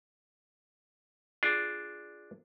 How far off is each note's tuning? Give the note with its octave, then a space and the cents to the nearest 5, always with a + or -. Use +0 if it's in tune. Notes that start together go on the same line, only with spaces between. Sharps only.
D4 +0 F4 +0 G#4 +0